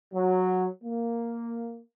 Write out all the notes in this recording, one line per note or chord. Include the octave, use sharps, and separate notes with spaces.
F#3
A#3